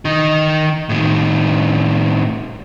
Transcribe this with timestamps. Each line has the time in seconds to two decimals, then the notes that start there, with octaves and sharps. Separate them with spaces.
0.05 D#3 D#4
0.89 A2 D#3